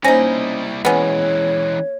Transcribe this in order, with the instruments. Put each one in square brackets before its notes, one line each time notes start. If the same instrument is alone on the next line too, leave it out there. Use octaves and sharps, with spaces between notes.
[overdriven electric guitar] G3 E4 [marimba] A#3 C5 A#6 [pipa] C#4 D#4
[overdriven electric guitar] E3 G#3 [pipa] B3 C#4 [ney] C#5